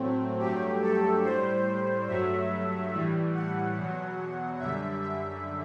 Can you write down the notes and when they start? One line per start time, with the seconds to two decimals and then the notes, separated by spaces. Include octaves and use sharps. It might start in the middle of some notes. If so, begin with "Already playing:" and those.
Already playing: A2 F#3 A3 C4
0.40 G2 F#3 A3 G4
0.82 A4
1.25 A2 G3 C5
2.08 G2 F#3 A3 E5
2.91 A2 E3 G3
3.35 F#5
3.76 E2 B2 F#3
4.59 F#2 D3 G3 E5
5.02 E5